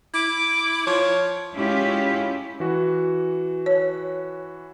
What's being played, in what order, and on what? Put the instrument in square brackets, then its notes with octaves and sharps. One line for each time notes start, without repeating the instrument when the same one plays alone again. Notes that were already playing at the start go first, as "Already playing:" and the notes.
[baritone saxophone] E4 [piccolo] D6
[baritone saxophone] F3 [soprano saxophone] C#5
[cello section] G#3 C#4 E4 F4 G4
[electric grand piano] E3 F#4
[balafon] C#5